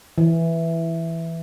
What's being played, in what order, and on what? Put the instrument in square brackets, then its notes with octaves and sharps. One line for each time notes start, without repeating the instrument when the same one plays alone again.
[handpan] E3